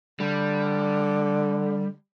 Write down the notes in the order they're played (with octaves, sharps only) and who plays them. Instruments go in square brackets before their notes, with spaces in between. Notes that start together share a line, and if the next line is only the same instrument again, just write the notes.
[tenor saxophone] D3 [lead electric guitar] G3